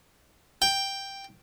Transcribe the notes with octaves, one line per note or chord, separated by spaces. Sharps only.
G5